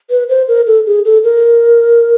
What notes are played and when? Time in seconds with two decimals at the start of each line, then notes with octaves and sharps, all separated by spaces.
0.10 B4
0.29 C5
0.48 A#4
0.67 A4
0.87 G#4
1.05 A4
1.24 A#4